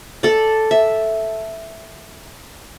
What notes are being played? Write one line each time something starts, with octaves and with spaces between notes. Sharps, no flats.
A4 D5
E5